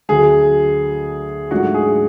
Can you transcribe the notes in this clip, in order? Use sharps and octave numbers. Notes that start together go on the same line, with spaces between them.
D2 D3 F#3 G#4
G#2 F#3 A3 D4 F4 F#4
G#4